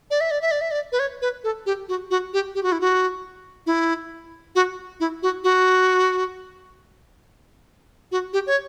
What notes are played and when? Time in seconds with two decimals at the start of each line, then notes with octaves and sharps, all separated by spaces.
0.11 D5
0.21 E5
0.31 D5
0.42 E5
0.51 D5
0.61 E5
0.71 D5
0.92 B4
0.99 C#5
1.22 B4
1.44 A4
1.66 G4
1.89 F#4
2.11 F#4
2.33 G4
2.55 G4
2.63 F#4
2.72 E4
2.81 F#4
3.66 E4
4.55 F#4
5.00 E4
5.23 F#4
5.44 F#4
8.12 F#4
8.33 G4
8.47 C#5